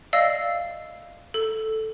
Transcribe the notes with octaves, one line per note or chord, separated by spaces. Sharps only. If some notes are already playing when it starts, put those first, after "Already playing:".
D5 D#5 F5 E6
A4